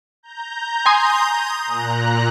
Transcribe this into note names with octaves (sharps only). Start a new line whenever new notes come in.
A#5 G6
G#5 C6 D#6
A#2 A#5 F#6